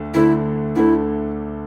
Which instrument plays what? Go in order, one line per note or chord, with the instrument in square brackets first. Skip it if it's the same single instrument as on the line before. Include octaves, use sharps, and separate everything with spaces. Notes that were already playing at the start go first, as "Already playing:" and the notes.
Already playing: [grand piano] D2 D3 A3
[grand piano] D2 D3 A3 [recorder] E4
[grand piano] D2 D3 A3 [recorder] E4